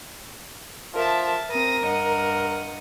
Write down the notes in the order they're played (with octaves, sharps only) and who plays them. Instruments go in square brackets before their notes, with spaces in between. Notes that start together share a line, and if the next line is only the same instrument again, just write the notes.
[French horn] F3 [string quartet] A#4 E5 A5
[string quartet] C4 D#6 A#6 [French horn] A#4
[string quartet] G2 D#5 F#5